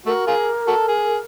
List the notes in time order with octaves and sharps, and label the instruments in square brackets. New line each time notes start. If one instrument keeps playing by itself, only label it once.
[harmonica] A3 F#4 [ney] A#4
[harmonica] F4 G#4
F#4 A4
G#4